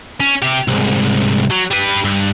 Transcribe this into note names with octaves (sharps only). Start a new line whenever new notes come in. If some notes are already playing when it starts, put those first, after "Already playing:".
C#4
C3 G4
C2 G#2
F#3
G3 B4
G2